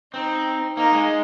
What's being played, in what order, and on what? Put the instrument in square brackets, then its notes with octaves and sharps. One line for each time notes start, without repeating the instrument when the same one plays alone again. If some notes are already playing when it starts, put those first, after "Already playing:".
[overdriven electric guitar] C4 [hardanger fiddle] D#4
[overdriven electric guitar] A#3 [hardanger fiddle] D#4
[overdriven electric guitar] G#3